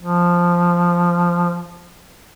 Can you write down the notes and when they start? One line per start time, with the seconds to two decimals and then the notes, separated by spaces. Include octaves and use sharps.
0.01 F3